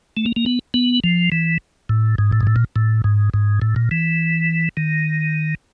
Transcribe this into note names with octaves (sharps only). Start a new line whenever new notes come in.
A3
A#3
A#3
B3
B3
F3
E3
A2
G#2
A2
G#2
A2
A#2
A2
G#2
G#2
A2
A#2
E3
D#3